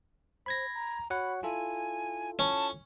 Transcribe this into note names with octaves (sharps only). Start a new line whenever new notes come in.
C5 B5 G#6 A#6
A#5
F#4 C#5 F#5 B5
E4 F4 A4 G#5
C#4 A5